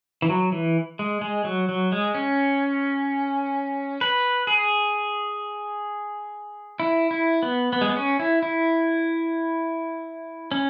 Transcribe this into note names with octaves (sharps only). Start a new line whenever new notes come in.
E3
F#3
E3
G#3
G#3
F#3
F#3
G#3
C#4
B4
G#4
E4
E4
B3
B3
G#3
B3
C#4
E4
E4
C#4